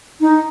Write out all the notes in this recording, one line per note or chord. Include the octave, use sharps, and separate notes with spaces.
D#4